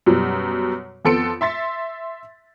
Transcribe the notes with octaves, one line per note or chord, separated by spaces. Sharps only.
F#2 B2 F#3 G3
F2 B3 A4 C6 C#7 D7
E5 C6 A6 B6